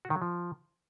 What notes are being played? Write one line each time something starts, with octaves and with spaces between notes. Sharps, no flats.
F#4
D#3
F#3
F3